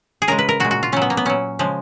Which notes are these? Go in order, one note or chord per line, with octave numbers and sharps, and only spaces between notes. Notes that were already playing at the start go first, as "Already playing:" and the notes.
G#4
C#3 G#3 A#4
B4
A#4
A#2 G#3 F#4
F#4
F4
A#2 F#3 C#4
B3
A#3
B3
A#2 F#3 C#4
C#3 F3 G#3